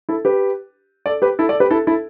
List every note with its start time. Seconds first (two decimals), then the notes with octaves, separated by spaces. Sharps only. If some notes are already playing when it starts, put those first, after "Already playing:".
0.09 E4 A4
0.25 G4 B4
1.06 A4 D5
1.22 G4 B4
1.39 E4 A4
1.49 A4 D5
1.60 G4 B4
1.71 E4 A4
1.87 E4 A4